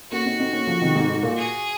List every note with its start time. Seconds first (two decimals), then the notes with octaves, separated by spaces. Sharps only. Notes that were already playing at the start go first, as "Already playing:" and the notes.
0.12 A#3 C#4 F#4
0.26 C4 D#4
0.39 C4 D#4
0.53 A#3 C#4
0.67 C#3 F3
0.81 C3 D#3
0.95 G#2 C3
1.09 G#2
1.23 A#2
1.37 G#4